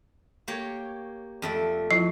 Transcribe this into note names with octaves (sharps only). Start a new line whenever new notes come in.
A#3 G4 C#5
F2 A3 D5
F3 E4 F4 C7